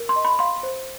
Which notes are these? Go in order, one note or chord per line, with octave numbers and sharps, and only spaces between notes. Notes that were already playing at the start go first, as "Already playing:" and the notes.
Already playing: A#4
C6
D#5
B5
F5 C6
C5